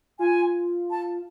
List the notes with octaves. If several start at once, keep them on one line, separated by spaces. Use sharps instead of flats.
F4 G#5
A5